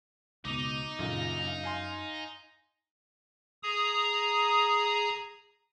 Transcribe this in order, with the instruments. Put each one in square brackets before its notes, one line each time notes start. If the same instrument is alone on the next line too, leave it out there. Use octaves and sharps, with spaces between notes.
[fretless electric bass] C#2 B2 [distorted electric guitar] D#4 [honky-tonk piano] D6 D#7 F7
[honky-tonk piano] A#1 A#2 C#3 [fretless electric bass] F#2
[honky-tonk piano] F5 G#5 C6
[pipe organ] G#4 A#5 D#6